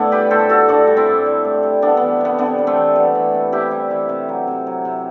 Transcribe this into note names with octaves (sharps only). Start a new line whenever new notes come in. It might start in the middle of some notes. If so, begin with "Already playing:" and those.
Already playing: A2 A3 B3 D4 E4
G3 G4 B4
A2 A4 C5
G3 F#4 A4
A2 D4 F#4
G3
C4 E4
A2
G3
A2
G3
G3 B3 D4
E3 B3
C3 B3
C3 B3 D4
G3
A3 C4
E3
G3 B3
E3
C3
C3 E4 G4
G3
E3
C3
F#3
C3
F#3
C3